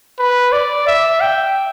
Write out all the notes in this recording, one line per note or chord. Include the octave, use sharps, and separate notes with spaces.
B4
D5
E5
G5